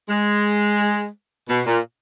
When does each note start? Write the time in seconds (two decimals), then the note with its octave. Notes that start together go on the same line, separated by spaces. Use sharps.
0.08 G#3
1.49 B2
1.67 A#2